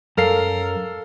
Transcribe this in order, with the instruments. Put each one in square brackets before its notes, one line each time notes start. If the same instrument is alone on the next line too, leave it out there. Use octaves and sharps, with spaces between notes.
[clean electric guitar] F#2 [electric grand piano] A4 F5 C7 [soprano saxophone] A#4